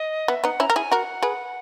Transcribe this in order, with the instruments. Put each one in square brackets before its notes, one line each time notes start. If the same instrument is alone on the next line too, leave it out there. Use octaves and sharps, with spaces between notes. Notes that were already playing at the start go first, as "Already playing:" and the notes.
Already playing: [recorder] D#5
[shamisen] B3 [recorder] E5
[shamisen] B3 D#4 [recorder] F#5
[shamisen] C#4 E4 [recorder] A#5
[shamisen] A#4
[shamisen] E4 G#4 [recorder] G#5
[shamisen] F#4 A#4 [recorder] F#5
[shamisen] G#4 B4